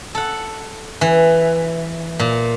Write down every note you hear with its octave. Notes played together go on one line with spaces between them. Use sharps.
A4 F#5
E3
A#2